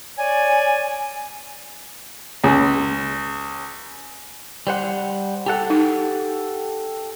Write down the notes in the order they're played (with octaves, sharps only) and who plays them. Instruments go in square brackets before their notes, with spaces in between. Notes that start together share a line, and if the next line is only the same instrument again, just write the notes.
[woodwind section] C#5 D5 G#5
[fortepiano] C#2
[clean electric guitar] G3 C5 F#5
G4 A4 F#5
[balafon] D#4